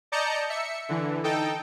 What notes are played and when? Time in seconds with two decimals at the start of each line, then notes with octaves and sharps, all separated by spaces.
0.12 D5 D#5 A5 A#5 G6 C#7
0.50 E5 C#7
0.89 D3 E3
1.24 D#4 A4 G5